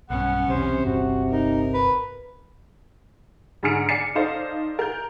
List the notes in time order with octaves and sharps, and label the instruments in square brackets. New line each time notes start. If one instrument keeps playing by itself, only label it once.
[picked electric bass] B1 G2 [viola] B3 C#4 [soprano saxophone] F#5
[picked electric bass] B1 E2 [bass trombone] C3 [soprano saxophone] C5
[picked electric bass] G1 C2 [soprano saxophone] F#4
[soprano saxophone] D#4 [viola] A#4
[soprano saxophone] B4
[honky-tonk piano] G#2 D3 G#4 F6 C#7 D7
D5 G#5 C7 C#7
D#4 A4 C5 D5 D#5 F5
A#4 G6